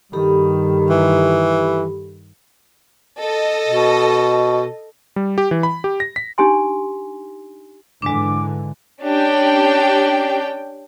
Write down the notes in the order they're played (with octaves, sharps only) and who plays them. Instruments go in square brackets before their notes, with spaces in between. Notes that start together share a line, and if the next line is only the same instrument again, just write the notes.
[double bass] G2 D#3 [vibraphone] G4 A4 B5
[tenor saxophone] E3
[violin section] A4 D#5
[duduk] B2
[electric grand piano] G3
G4
E3
B5
G4
A#6
B6
[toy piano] D4 D#4 G4 G#5 C6
[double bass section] G#2 D3 E3 [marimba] G#3 D4 [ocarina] D6
[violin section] C#4 D4 G4 G5